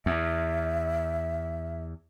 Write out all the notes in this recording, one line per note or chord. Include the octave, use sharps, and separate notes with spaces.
E2 E5